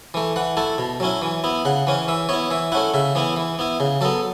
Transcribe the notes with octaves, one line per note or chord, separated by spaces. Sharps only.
E3 A3
E3 F#5
A3 E4 A5
B2
F#3 C#4 E4
E3
B3 E4
C#3 F#5
E3 C#4
E3 E5
B3 E4 C#5
E3 E5
A3 C#4 E4 F#5
C#3 E5
E3 B3 E4
E3
B3 E4
C#3
F#3 B3 A4